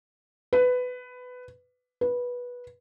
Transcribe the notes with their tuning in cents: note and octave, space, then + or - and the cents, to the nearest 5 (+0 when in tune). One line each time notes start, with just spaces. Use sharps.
B4 +15
B4 -15